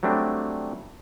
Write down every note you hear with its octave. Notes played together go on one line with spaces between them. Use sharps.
F#3 G3 A3 C4 D4